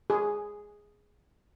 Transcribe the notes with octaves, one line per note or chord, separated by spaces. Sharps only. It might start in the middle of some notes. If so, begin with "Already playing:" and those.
G#4